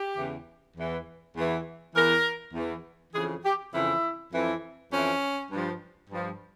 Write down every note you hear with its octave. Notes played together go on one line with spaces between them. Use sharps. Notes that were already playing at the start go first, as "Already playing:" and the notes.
Already playing: G4
E2 C#3 E3
E2 E3
E2 E3
E2 E3 A#4
E2 E3
F2 C#3 E3 G#4
G4
F2 C#3 E3 E4
F2 E3
F2 E3 C#4
G2 F3
G2 F3